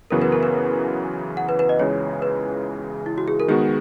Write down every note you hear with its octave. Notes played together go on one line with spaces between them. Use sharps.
F#2 C#3 E3 B3 F#4 A#4
B4
A#4
B4
F#5
B4
B4
D#5
C#2 C#3 E3 G#3 C#5
B4
E4
F#4
G#4
A#4
D#3 G#3 B3 F#4 G#4